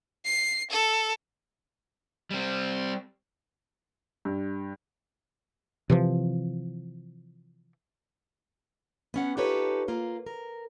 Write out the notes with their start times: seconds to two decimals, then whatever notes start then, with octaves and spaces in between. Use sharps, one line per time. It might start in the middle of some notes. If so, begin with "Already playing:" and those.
0.25 C7
0.71 A4
2.31 G3 C4
4.25 G2
5.90 C3 E3 F3
9.14 B3 C#4 F#5
9.37 D#4 F4 G4 A4 B4 C#5
9.88 A#3 F4
10.26 A#4